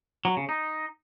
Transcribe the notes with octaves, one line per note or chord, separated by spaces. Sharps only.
F#3
C#3
D#4